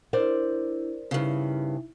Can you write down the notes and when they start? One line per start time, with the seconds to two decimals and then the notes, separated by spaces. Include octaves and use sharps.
0.13 D4 E4 A#4 C5 D5
1.11 G2 C#3 D#4 E4 E5